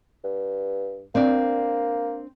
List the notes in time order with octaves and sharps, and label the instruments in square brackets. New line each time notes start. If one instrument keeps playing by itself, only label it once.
[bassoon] G2
[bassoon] A#3 [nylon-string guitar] C4 D4 D5